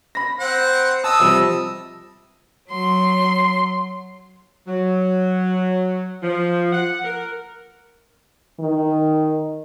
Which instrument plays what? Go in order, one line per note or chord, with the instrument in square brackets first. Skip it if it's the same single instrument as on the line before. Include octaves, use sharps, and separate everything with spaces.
[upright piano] B5 A#6
[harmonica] C4 F#5
[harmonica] D#5 E6 [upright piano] A5
[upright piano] C3 F3 G3
[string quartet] F#3 C6
[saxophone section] F#3
F3
F#5
A#4
[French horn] D#3